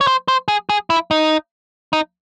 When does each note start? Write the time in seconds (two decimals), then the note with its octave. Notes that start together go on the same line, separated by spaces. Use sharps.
0.01 C#5
0.07 C5
0.28 C5
0.48 G#4
0.69 G#4
0.90 E4
1.11 D#4
1.93 D#4